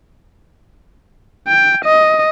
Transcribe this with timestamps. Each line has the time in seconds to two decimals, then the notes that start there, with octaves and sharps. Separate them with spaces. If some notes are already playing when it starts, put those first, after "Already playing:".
1.48 G5
1.84 D#5